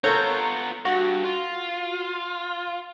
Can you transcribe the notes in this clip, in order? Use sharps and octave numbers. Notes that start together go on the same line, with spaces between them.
B3 F4 A4 A#4 C#5 A#5 C#6 G6
G2 F#4
F4